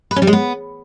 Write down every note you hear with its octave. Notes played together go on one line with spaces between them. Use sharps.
B4
C#4
G3
G#3
B3